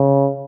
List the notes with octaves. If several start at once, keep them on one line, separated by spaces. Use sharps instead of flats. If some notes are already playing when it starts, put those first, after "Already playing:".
Already playing: C#3